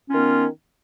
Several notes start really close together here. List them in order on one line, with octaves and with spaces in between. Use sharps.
C#4 F4 D#3 B3